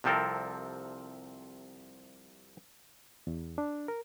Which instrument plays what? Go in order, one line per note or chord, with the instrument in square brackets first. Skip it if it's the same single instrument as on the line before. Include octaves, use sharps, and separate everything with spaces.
[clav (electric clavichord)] C2 C3 F3 C4 A4 A#4
[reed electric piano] E2
D4
A#4